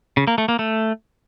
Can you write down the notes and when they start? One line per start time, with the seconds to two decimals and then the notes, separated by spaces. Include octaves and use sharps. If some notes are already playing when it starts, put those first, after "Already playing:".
0.17 C#3
0.28 A#3
0.38 A3
0.49 A#3
0.59 A3